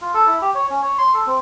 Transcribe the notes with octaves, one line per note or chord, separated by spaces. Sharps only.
F4
A4
E4
G4
C#5
C#4
C#5
C6
A4
C4